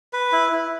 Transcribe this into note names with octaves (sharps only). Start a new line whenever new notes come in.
B4
E4
E4